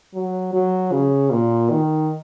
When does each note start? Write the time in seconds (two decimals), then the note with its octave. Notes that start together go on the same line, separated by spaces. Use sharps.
0.14 F#3
0.53 F#3
0.92 C#3
1.31 A#2
1.70 D#3